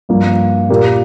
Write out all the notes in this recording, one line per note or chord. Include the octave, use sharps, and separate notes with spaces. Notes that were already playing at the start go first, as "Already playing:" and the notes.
G2 F3 A#3
A#2 A#3 G4 A#4